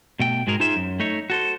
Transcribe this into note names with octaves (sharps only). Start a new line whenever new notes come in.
B2 A3 G5
G#2 G#3 F#4 G#4 A#4
D#4 F4 G#4 C5 E5
F#2
A3 D#4 C#5
F#4 A4 C5